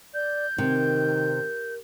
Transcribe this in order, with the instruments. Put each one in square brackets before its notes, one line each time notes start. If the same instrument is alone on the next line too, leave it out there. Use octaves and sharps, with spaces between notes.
[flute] D5 [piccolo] G6
[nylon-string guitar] C3 [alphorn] D#3 [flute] A#4